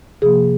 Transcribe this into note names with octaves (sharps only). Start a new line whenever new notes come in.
C3 F3 A#3 G#4